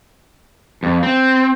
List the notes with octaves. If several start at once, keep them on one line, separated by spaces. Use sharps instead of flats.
F2
C4